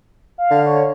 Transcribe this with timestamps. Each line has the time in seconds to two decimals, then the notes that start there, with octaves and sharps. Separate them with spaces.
0.38 F5
0.50 D3
0.66 C#5